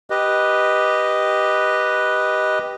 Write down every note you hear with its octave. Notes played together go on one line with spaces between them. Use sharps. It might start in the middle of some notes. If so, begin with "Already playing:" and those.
G4 B4 D#5